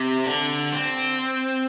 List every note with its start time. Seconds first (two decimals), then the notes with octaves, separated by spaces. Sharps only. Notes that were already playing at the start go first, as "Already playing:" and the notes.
Already playing: C3
0.26 D3
0.73 C4